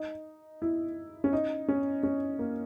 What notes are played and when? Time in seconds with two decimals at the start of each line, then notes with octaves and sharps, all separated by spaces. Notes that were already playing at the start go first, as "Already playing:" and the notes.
Already playing: D#4
0.62 E4
1.24 C#4
1.33 D#4
1.68 C#4
2.03 C#4
2.39 A#3